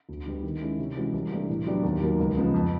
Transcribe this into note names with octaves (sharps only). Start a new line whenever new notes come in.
D2
D3 G3 B3
D#3
G#3 C#4 E4
C3
E3 G#3 C#4 F#4
C2
C3 E3 A3 D4
A2
F#3 B3 D4 G4
D#2
D#3 F#3 A#3
C#2
C#3 F3 G#3 B3
F2